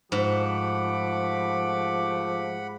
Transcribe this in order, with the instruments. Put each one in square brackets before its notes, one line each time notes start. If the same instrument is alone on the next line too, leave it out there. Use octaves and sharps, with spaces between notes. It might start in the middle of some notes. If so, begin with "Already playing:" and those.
[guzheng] G#2 [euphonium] F3 [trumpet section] A3 G4 D6 [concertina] F#5 B5